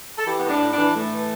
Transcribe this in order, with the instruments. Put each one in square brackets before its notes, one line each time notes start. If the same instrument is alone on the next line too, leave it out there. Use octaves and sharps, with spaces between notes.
[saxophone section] A4
E3 G4
B3
A2
D4
A2
D4
E3
A2 A3
E3